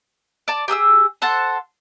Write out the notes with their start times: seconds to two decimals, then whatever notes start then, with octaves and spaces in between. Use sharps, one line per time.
0.48 D5 A5
0.68 G4 G#4 D#6 E6
1.22 A4 C5 F#5 A5